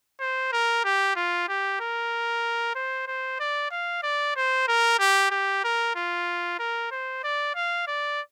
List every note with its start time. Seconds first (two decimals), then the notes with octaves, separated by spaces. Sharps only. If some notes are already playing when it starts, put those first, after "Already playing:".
0.20 C5
0.52 A#4
0.84 G4
1.16 F4
1.48 G4
1.80 A#4
2.75 C5
3.07 C5
3.40 D5
3.71 F5
4.03 D5
4.36 C5
4.68 A#4
4.99 G4
5.31 G4
5.64 A#4
5.96 F4
6.59 A#4
6.91 C5
7.24 D5
7.55 F5
7.87 D5